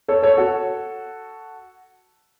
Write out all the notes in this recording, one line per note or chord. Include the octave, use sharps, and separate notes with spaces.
A4 C#5
A4 C#5
F#4 A4